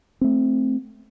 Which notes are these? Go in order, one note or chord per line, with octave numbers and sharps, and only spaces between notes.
A3 C4